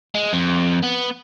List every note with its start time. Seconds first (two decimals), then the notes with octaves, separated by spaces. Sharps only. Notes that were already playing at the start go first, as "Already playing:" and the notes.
0.15 G#3
0.33 F2
0.83 B3